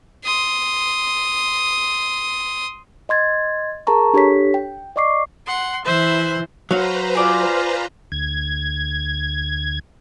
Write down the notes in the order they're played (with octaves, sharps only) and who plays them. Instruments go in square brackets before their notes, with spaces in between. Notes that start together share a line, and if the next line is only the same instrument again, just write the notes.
[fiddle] C6 D#6
[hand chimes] D#5 C6 G#6 A6
G#4 A#4 A5 A#5 C#6
D4 G4 A4 C#5 B6
G5
D5 D#5 C#6 D6 C7
[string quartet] F#5 C6
[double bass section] E3 [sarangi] C5 [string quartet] E5 F#6
[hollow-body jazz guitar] F#3 F#4 [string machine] B4 C5 A#5 [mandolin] F5
[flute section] F4 [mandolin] G#4 D5 D#6
[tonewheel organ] D2 G#6